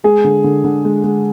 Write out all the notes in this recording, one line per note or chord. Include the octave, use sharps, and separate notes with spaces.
G#3 G#4
D3
D3
D3
G#3
G#3